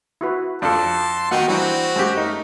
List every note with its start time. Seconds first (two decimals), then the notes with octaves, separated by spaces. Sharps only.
0.21 E4 F#4 B4
0.62 F2 D4 A4 D5 F5 A5 C6
1.31 D#3 A#3 B3 D#4 F#4 F#5 G5
1.48 E3 G3 C4 D4 F#4 G5
1.96 F#2 G#3 G4
2.17 A3 D#4 A#4